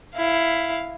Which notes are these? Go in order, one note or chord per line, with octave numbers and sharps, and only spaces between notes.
E4 F5